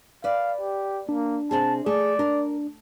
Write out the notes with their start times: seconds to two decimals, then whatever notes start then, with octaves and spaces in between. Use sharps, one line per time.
0.24 B4 D5 F5
0.60 G4
1.09 A#3 D4
1.51 C3 C4 G#4 A5
1.86 A3 G#4 D5
2.19 D4 A#4